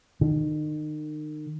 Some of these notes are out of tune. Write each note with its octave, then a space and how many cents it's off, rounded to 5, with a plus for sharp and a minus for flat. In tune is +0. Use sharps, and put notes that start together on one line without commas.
D#3 -35